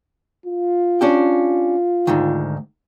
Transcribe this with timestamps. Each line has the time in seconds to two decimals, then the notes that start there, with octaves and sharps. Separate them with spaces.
0.46 F4
1.01 C#4 D4 G4
2.07 D2 G#2 D#3